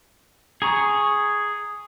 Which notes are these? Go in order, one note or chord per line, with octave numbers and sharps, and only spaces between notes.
G#4 A#5 C#6